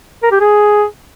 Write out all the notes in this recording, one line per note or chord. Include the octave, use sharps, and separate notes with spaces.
A#4
G4
G#4